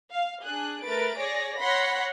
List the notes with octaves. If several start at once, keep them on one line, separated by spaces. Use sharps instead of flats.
F5
D4 G#4 F#6
A3 A#4 B4 A6 D7
G#4 C#5 D5 A#6
C#5 F#5 B5 C6 A#6 B6